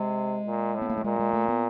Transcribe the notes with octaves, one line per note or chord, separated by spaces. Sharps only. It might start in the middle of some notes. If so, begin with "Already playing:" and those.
Already playing: C3 G#3
A#2
A2
B3
A#3
A3
A#2 G#3
G#3
A3
B3